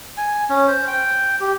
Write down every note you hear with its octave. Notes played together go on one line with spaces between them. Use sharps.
G#5
C#4
C5
G5
G4